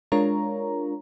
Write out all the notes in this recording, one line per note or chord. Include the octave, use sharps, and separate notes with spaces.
G#3 D4 F4 A#4 C#5 A#5